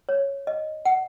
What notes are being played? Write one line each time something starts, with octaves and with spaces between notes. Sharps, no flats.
C#5
D#5
F#5